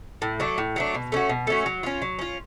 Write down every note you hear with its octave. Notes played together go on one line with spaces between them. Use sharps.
A2
F#3 A3 D4
A2
F#3 A3 D4
B2
A3 C#4 F#4
B2
A3 C#4 F#4
F#3
C#4 F4
F#3
C#4 F4